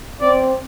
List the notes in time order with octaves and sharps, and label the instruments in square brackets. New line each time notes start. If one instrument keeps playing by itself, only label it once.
[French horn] C4 [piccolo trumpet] D5